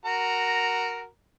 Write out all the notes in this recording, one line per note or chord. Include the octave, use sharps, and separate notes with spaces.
F#4 A#4 A#5